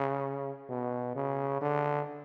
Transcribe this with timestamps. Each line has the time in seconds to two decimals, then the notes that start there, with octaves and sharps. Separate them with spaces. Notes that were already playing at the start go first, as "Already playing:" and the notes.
Already playing: C#3
0.69 B2
1.15 C#3
1.62 D3